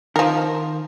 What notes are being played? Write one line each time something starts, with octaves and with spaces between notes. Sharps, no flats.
D#3 F3 A#4